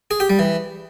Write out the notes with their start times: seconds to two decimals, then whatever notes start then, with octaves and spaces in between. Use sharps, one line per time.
0.11 G#4
0.20 G4
0.30 G3
0.39 E3